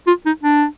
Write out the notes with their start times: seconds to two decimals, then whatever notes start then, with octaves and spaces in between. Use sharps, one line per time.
0.07 F4
0.26 D#4
0.44 D4